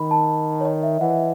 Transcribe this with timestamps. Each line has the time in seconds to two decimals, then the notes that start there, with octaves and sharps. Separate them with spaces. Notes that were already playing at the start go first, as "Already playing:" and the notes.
Already playing: D#3 B5
0.11 A5
0.61 C#5
0.65 D#5
0.83 E5
1.01 E3 F#5